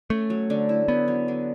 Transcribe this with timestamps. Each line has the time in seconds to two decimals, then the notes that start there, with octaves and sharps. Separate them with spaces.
0.10 A3 C#4
0.30 F#3
0.50 D3
0.69 E4
0.88 B3 C#4
1.08 F#3
1.28 D3